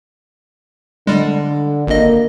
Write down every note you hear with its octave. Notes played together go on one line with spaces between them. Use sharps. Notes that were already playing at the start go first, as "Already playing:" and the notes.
D3 G3 G#3
G#1 A#3 D#5